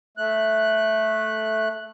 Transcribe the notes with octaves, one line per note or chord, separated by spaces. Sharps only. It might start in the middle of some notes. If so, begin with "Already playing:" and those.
A3 F#6